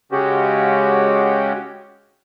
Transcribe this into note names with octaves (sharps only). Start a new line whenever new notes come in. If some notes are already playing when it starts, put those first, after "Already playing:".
C#3 G#3 C#4 F#4 G4